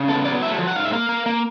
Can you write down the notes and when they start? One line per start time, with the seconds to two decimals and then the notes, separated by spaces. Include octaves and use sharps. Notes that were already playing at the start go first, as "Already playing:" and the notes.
Already playing: C#3
0.09 B3 A4
0.25 F#3 D5
0.42 A3 E5
0.58 F3
0.67 F#5
0.76 G#2 F5
0.84 E5
0.92 A#3 F5
1.09 A#3
1.26 A#3